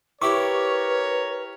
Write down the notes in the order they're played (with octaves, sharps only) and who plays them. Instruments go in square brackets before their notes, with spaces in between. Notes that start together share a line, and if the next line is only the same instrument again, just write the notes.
[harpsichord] E4 G4 [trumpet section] A#4 C#5 [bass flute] B4 [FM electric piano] C#6 D6